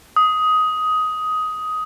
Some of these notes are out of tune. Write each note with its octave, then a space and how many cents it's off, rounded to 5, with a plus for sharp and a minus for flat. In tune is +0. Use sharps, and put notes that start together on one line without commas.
D#6 +15